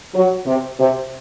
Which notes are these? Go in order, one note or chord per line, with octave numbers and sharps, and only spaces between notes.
F#3
C3
C3